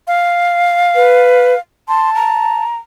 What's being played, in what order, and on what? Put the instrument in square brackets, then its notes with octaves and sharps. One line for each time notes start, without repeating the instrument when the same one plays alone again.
[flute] F5
[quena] B4
[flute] A5 [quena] C6
[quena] A#5